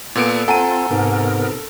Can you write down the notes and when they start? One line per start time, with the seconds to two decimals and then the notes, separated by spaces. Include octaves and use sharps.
0.15 A#2 B3 A4 D7
0.48 C4 F4 A4 F#5 G#5 A#5 D#7
0.91 G#2 C3 B3 A#4